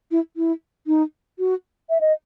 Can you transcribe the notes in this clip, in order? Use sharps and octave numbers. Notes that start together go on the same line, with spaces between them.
E4
E4
D#4
F#4
E5
D#5